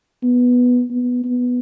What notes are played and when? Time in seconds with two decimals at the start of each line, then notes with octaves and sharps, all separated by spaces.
0.23 B3
0.90 B3
1.24 B3